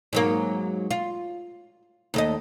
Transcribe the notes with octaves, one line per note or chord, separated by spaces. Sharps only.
G#2 F#3 A#3
F4
D#2 A3 D#5